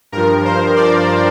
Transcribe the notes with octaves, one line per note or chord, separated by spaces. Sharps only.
G2 F3 A#4
C5
D5